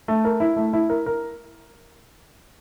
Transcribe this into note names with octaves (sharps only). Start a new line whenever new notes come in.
A3
A#4
E4
A3
E4
A#4
A#4